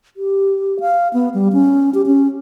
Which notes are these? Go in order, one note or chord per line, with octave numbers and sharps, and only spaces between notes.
G4
F5
B3
G3
C#4
G4
C#4